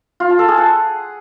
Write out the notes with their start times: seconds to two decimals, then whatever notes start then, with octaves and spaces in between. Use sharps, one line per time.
0.20 F4
0.30 A5
0.39 A4
0.48 G#4
0.58 F#5